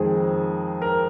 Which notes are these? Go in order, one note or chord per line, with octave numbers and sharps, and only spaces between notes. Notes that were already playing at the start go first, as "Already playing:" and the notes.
Already playing: F2 D#3 G#3 G#4
A#4